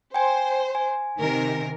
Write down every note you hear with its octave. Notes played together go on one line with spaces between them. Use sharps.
C5 G5 G#5
G#5
C3 D#3 A#4